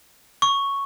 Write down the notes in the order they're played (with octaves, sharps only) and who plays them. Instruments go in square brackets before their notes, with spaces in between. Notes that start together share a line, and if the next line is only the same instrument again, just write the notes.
[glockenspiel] C#6